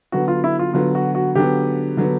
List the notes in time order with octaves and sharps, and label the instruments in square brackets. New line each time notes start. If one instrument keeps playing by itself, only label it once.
[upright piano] D3 F#3 B3 [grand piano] F#4
[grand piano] F4
E4
F4
[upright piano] D3 F#3 B3 [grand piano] F4
[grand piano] F#4
F#4
[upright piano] D3 F#3 B3 [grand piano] G4
[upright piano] D3 F#3 B3